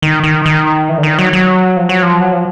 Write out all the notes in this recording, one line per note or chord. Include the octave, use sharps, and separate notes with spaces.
D#3
D#3
D#3
E3
D3
D#3
F#3
F#3
F3
F#3
F3
F#3
F3